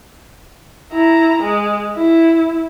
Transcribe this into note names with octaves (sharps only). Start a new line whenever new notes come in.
E4 A#5
G#3
E4